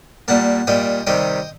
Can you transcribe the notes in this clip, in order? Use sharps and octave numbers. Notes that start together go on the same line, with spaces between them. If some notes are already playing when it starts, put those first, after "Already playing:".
A#2 G3 A#3 F#5 A5
A#2 G3 A#3 D#5 G5
C3 D#3 G3 D#5 G5